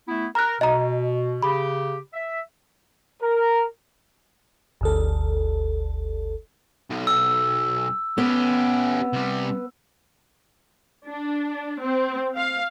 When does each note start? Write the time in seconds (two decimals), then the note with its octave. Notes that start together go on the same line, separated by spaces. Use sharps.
0.07 A3 B3 E4
0.35 A#4 A#5 F#6
0.61 B2 D#5 A#5
1.43 C#3 G4 B5
2.13 E5
3.22 A#4
4.81 G1 D2 A4
6.90 B1
7.07 E6
8.18 B3 C#4 G4
9.13 C3 G3
11.07 D4
11.81 C4
12.34 F5